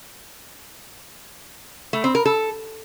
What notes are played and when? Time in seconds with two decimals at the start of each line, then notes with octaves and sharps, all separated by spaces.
1.93 A3
2.04 C4
2.15 A#4
2.26 A4